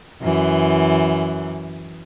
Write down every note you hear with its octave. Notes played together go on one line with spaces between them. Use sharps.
F#2 E3